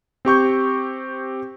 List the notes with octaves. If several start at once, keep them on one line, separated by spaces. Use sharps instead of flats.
C4 G4 C#6 G6